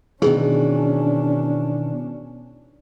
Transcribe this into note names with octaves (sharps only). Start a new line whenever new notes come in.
B2 D#3 E3 C#4 D4 G#4